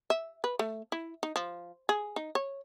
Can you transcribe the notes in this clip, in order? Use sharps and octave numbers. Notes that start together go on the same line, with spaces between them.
E5
B4
A3
E4
D#4
F3
G#4
D#4
C#5